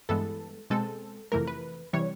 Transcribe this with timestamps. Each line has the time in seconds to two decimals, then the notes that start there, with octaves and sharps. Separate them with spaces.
0.09 G2 E3 G#3 B3 A4
0.70 B2 G#3 C4 A4
1.32 F2 C3 E3 A3 A#4
1.47 B4
1.93 C3 E3 G3 C#5